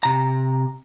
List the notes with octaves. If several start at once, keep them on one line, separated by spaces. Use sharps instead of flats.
C3 A#5